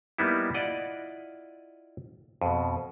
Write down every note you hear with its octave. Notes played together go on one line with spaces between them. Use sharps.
G3 A#3 B3 D#4 E4
E4 F4 D5 D#5 F#5
F2 B2